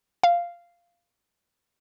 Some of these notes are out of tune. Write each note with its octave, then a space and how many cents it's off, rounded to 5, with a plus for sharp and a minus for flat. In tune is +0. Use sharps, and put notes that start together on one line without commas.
F5 -10